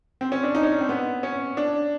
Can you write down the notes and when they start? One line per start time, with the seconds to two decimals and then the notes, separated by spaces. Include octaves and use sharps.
0.21 C4
0.32 C#4
0.44 D4
0.55 D#4
0.63 C#4
0.81 C4
0.89 B3
1.23 C#4
1.57 D4